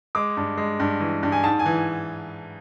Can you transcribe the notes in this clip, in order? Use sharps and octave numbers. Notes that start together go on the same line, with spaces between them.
G#3 D6
G2
G#3
G2
E3
G2
G#5
G#2 A5
G#5
E3